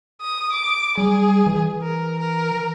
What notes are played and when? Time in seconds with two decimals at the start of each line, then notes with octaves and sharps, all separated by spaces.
0.21 D#6
0.52 D6
0.98 G3 G#4
1.47 E3
1.82 A#4
2.19 A#4